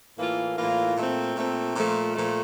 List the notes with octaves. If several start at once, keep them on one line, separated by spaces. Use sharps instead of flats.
A2 E3 A#3 F4
A2 E3 A#3 F4
A#2 A3 C4
A#2 A3 C4
A#2 F3 A3
A#2 F3 A3